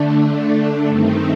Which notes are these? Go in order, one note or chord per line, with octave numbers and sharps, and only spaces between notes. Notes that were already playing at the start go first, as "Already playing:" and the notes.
Already playing: D3 A3 D4
G2 D#3 A3 C4 D#4